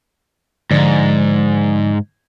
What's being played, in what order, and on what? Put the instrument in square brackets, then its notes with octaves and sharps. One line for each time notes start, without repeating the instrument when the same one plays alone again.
[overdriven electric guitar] G#2 [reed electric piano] D3 F3 D5